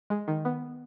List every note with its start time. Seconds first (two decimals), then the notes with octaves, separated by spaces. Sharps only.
0.10 G#3
0.28 D#3
0.45 B3